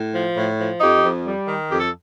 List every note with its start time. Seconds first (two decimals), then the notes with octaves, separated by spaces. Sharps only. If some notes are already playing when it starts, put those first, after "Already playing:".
Already playing: A2
0.14 F3
0.36 A2
0.60 F3
0.81 F2 D#4 G4
1.04 F2
1.26 G3
1.48 D#3
1.70 F2 G4
1.80 A4